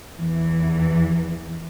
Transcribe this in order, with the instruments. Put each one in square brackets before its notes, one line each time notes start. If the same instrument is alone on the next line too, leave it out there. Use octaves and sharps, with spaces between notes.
[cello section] E2 E3